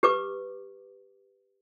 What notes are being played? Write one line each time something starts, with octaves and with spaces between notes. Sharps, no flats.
G4 B4 D6